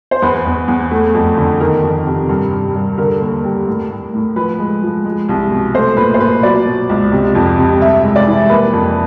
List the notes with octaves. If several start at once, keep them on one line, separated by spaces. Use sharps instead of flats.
C5
E2 B4
E2
E2
A3
F2
D3
D#3 A#4
F2
C3
G2
G2
G2
D3 A#4
D#2
G3
A2
A2
A2
F3 B4
G#3
F3
G#3
C2
B2
A3 C5
A#2 B4
C5
A#2 B4
F#3 D5
B2
C#2
C3
F2
C3
G2 E5
G#3
D5
E3
A#3 B4
F2